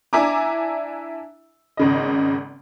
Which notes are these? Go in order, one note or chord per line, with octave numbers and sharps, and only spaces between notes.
D4 E4 E5 G#5 A#5 D6
G#1 C#3 D#5